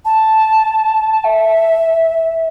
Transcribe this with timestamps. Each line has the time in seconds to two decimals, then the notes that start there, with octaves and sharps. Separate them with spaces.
0.05 A5
1.24 E5